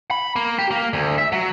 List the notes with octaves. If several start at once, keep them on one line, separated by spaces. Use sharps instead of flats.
B5
A#3
G4
A#3
D2
E5
F#3